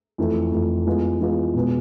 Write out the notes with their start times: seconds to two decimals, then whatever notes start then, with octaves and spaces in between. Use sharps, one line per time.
0.18 F2 E3 A3
0.52 F2 E3 A3
0.87 E3 G#3 B3 F4
1.21 E3 G#3 B3 F4
1.54 B2 G#3 B3